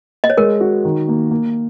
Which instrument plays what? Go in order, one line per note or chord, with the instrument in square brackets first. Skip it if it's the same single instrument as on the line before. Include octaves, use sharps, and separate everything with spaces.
[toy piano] D#5
C#5
[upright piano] G#3 [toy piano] A#4
[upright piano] F#4
D#3
A#3
A#3